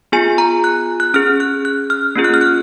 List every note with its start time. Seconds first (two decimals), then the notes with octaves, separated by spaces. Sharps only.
0.12 B3 F4 G#4 G#5
0.38 A#5
0.64 F#6
1.00 F#6
1.14 C#4 G#4 F6
1.40 F#6
1.65 F#6
1.90 F6
2.16 A#3 C#4 F4 G#4
2.24 F#6
2.34 F6
2.41 F#6